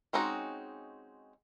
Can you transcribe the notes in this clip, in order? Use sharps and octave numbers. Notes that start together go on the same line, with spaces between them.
G#3 C4 C#4 D#4 F#4